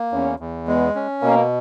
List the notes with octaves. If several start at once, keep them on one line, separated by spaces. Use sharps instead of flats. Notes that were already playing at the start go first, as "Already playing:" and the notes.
Already playing: A#3
E2 C#4
E2
G#3 B3
C#4
B2 A#3